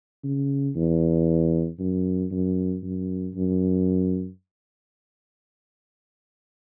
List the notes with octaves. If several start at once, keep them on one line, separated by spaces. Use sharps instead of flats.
C#3
E2
F#2
F#2
F#2
F#2